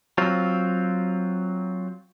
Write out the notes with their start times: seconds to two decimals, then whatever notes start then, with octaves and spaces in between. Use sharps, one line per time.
0.18 F#3 C4 F4